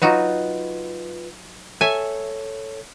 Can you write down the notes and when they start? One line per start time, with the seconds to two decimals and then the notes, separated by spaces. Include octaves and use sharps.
0.02 F#3 D#4 F4 F#4 B4
1.81 A4 C#5 E5 G#5